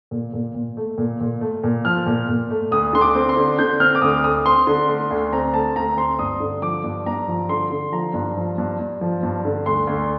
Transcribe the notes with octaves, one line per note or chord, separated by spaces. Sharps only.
A#2
A#2
A#2
A3
A#2
A#2
A3
A#2
F3 F6
A#2
A#2
A3
D2 D#6
D3 C6
D6
C4
C6
D3
D3 G6
C4 F6
D6
D2 D#6
A3 D#6
C4 C6
D3
A3 C6
D2
C4 A#5
A3 A5
D2 A#5
C4 C6
G2 D#6
D3
F3 D6
G2
G2 A#5
F3
D3 C6
D3
F3 A#5
G2
F3
G2
G2
F3
G2
D3
D2 C6
D2